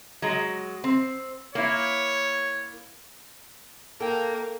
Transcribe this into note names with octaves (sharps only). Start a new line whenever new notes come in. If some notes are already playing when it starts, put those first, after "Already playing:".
F#3 G#3
C4
A#3 E4 C#5
A#3 A4 A#4 G5